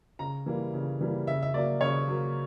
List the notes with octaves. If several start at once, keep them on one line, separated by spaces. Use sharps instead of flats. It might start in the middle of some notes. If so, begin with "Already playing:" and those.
C#3 A#5
E3 G3 A#3
C#3
E3 G3 A#3
C#3 E5
E5
F#3 A#3 D5
C#3 C#5
F#3 A#3